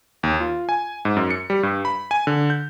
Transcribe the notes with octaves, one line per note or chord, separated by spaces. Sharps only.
D#2
F4
G#5
G#2
F#2
C#7
G3
G2
B5
G#5
D3
G6